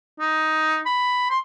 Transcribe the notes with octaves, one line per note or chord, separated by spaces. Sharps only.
D#4
B5
C6